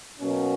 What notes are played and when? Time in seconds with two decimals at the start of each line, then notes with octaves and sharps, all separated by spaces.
0.19 B2 F#3 A#3 C#4